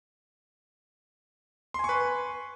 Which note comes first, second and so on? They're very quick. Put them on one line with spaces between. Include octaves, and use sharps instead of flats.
C6 G#5 C#6 B4